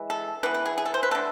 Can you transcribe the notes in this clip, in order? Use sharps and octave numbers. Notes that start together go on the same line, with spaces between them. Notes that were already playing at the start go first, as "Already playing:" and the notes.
Already playing: E3 G#3
A4
E3 B3 B4
B4
G#4
G#4
A4
C5
B4
D3 A3 A4